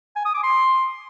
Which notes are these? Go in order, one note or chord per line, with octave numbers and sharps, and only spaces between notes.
G#5
D#6
D6
C6